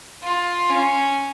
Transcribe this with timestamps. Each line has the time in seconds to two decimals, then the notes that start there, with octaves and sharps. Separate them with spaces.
0.23 F4
0.70 C#4